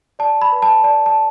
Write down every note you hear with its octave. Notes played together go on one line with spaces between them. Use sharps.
D5 A5
B5
B4
A5
D5 A5
A5